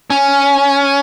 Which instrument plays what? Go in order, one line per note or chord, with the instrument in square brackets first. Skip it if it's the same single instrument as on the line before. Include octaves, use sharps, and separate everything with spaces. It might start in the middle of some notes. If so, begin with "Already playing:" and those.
[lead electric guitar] C#4